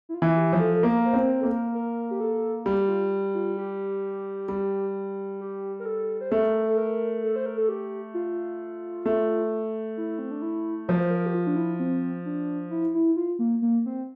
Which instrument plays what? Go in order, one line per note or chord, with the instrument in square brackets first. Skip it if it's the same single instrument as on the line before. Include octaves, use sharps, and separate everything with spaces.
[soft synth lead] E4
F4
[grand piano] E3
[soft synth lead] G4
[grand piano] F3
[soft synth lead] A4
A4
[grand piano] A#3 [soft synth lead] A#4
[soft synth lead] C5
[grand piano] C4 [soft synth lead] A#4
[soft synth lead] C5
A#4
[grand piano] A#3 [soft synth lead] A4
[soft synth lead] A#4
A#4
G4
A4
[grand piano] G3 [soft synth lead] G4
[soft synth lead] F4
F4
G4
[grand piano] G3
[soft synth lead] G4
A#4
A4
C5
[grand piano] A3 [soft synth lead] A#4
[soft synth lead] A4
A#4
A4
C5
A#4
A4
G4
F4
[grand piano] A3
[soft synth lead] E4
C4
D4
E4
[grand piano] F3 [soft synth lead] A#4
[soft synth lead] C5
A#4
G4
F4
D4
E4
C4
D4
E4
E4
F4
A#3
A#3
C4